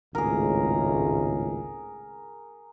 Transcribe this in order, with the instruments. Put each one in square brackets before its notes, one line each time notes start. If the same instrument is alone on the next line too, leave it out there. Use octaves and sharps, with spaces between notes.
[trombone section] G#1 C#2 A2 [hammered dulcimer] G#4 A#4